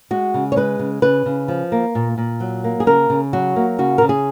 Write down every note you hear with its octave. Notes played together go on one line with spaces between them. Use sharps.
G#3 F#4
C#3
C#5
G#3 B4
C#3
C#3 B4
C#3
F3
A#3
A#2
A#2
F#3
A#3
G#4
C#3 A#4
C#3
F#3 F#4
A#3
C#3 F#4
C#3 A#4
G#4